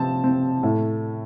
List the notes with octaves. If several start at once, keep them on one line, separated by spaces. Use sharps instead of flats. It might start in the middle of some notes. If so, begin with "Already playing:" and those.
Already playing: C3 F3 C4 A5
C4
A2